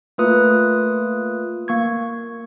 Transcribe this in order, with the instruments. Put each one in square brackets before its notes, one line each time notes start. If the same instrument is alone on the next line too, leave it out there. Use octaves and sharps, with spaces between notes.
[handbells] A3 A#3 F4 B4 D#6
A#3 C#6 G#6